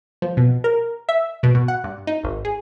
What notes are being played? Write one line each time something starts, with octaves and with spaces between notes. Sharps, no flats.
F3
B2
A#4
E5
B2
B2
F#5
G2
D#4
G#1
G#4